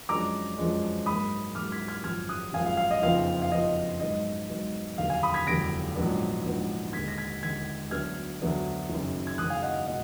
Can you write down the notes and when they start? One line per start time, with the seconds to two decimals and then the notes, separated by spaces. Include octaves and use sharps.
0.09 F#2 F3 G#3 D4 A#5 D6
0.57 F#2 F3 G#3 D4
1.06 G#2 F#3 A#3 B5 D#6
1.55 G#2 F#3 A#3 D6 F6
1.72 G#6 B6
1.88 F6 G#6
2.04 G#1 F#2 F3 F6 G#6
2.29 D#6 F#6
2.53 G#1 F#2 F3 F5 G#5
2.66 F5
2.77 F5
2.91 D#5
3.02 F#1 F2 F3 B3 D#4 F5
3.42 F5
3.51 F#1 F2 F3 B3 D#4 D#5
4.00 G#2 F#3 B3 D#4 D#5
4.49 G#2 F#3 B3 D#4
4.98 F1 D#2 D3 F#3 F5
5.10 F5 G#5
5.23 B5 D#6
5.34 G#6 B6
5.47 F1 D#2 D3 F#3 A#6 D7
5.95 A#1 G#2 F#3 B3 D4
6.44 A#1 G#2 F#3 B3 D4
6.93 D#2 D3 G#3 G#6 B6
7.08 A#6
7.18 G#6 B6
7.43 D#2 D3 G#3 G#6 B6
7.91 D2 D3 F#3 B3 D4 F6 G#6
8.41 D2 D3 F#3 B3 D4
8.89 F#1 F#2 D#3
9.27 G#6
9.38 F#1 F#2 D#3 D#6 F#6
9.50 F5 G#5
9.62 D#5 F#5
9.87 B2 G#3 D#5 F#5